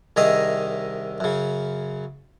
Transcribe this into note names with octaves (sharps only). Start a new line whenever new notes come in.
C2 D#3 G#4 D#5 E5 A#5
F#2 C#3